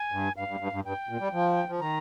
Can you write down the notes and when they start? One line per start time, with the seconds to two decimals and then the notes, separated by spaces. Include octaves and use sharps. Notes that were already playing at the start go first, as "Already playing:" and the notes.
Already playing: G#5
0.12 G2
0.36 G2 F5
0.48 G2
0.60 G2
0.72 G2
0.85 G2 G5
1.09 A#2
1.20 G3
1.33 F3
1.69 F3
1.80 D#3 A#5